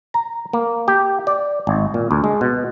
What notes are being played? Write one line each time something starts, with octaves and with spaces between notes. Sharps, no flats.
A#5
A#3
G4
D5
G#1
A#2
D2
G#3
B2